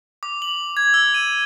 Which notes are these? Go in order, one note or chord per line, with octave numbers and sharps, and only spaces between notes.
D6
F#7
G#6
E6
D#7